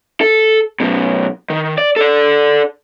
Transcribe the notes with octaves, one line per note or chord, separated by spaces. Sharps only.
A4
F#2 B2
D#3
D5
A4 D5